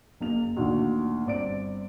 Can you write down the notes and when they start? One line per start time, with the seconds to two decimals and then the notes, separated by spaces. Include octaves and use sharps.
0.20 F#1 A#3 F7
0.57 D2 A#2 D3 D#3
1.25 G1 C4 D5 D7